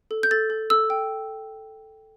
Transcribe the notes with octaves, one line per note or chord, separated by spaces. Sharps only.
A4
G6
A4 A6
A4
A4 E6
G5